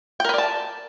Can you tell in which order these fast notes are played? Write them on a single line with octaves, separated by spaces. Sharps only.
G5 A#4 B4 D5 A5